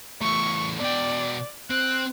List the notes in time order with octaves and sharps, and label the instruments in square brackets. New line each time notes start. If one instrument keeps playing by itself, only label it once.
[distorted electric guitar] E2 A3 [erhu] C#6
[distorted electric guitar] B2 G5 [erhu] D5
[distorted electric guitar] C4 [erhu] F#6